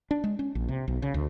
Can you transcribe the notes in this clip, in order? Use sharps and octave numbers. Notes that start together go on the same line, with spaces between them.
D4
G#3
C#4
A#1
C3
B1
C#3
D2